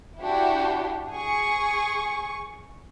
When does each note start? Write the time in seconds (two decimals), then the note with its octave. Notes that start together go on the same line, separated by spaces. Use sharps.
0.20 D4 E4 F#4 G4
1.12 G#4 C#6